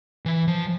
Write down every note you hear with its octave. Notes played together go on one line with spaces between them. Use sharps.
E3
F3